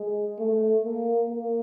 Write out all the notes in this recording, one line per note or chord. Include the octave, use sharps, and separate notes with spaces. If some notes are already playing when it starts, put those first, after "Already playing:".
Already playing: G#3
A3
A#3
A#3